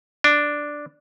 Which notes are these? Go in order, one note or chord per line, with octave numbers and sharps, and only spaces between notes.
D4